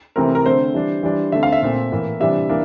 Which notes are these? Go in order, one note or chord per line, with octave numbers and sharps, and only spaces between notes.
C3 E3 A3 C4 A#4
A#4
D3 A3 C4 C5
E3 G3 D4
E3 G3 D4
D3 A3 C4 E5
F5
E5
A#2 A3 C4
A2 E3 A#3
C3 E3 G3 D4 E5
E3 A#3 D4